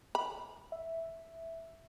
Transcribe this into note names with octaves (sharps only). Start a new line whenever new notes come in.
B5
E5